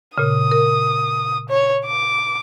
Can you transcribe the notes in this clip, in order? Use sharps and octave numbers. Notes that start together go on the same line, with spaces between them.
A#2 C#3 D#6
A#4
C#5
D6